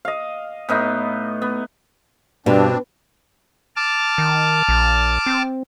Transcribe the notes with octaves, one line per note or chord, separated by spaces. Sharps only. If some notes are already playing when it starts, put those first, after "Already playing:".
D#5 F5
A2 B3 D#4
B3
G2 B2 C4 D4
A5 D6 F6
D#3
A#1
C4